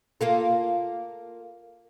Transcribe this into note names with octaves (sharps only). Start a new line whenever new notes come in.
A#3 F4 A4